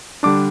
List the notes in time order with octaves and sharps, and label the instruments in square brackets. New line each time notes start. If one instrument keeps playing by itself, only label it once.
[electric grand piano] D3 G3 D4 D6